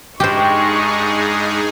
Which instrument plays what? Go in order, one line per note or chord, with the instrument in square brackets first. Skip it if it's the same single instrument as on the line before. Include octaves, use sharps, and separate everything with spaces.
[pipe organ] G2 G#3 [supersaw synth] D#4 G#4 [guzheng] G4 C5 [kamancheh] C#6